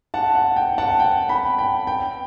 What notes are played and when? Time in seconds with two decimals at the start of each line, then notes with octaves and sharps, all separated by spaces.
0.14 F#5 A5
0.35 F#5
0.56 G5
0.78 F#5 A5
1.00 G5
1.29 G5 B5
1.59 G5
1.87 G5